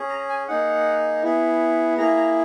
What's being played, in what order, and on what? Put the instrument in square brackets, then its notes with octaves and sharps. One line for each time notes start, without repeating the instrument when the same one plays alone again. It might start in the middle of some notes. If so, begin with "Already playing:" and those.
Already playing: [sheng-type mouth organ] C#4 G#4
A#5
G#5
A#3 D#4 G#4 F#5
B3 E4 G#4
A#3 E4 G#4 A#5
A#5